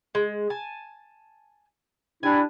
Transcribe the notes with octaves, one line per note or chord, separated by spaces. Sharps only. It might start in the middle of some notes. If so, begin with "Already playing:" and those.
G#3
G#5 A5
G3 D4 E4 G#5